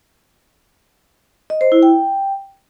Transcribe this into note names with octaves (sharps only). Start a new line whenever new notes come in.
D#5
C5
E4
G5